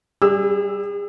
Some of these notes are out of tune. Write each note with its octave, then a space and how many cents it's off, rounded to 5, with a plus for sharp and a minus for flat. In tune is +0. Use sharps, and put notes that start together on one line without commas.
G3 +0 G#4 -40 E6 +0